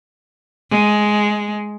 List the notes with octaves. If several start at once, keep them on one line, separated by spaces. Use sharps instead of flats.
G#3